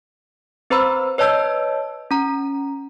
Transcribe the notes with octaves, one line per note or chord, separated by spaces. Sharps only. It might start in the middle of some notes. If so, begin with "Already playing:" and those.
C4 B4 C5 A#5 B5 E6
B4 C#5 D#5 A5 E6 G6
C#4 A#5